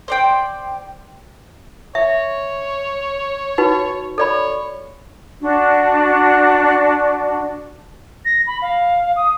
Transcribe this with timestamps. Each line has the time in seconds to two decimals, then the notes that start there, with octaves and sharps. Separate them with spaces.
0.08 C5 D5 G5
1.95 C#5 E5
3.58 D#4 F#4 B4
4.18 A4 C#5 D5 B5
5.41 D4 F#4
8.25 A#6
8.47 B5
8.62 F5
9.16 D#6